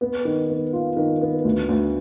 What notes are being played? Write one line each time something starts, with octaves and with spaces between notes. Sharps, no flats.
B3
D#3
B3
F4
D#3
B3
D2
D2